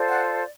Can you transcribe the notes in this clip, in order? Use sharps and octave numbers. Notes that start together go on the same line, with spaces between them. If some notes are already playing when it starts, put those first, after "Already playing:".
Already playing: F4 A4 C5 D5
F#5